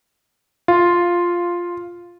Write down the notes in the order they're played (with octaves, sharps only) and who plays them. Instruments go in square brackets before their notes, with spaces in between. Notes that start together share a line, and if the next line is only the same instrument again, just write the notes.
[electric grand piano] F4